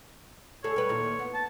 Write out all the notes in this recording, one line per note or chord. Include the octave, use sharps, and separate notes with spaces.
D2 G#4 A4 C#5
G3 B4
D#2 A#2
B3
A5